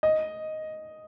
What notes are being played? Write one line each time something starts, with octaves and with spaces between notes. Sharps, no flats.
D#5